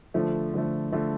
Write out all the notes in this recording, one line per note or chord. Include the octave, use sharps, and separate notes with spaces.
D3 F3 A3
D3 F3 A3
D3 F3 A3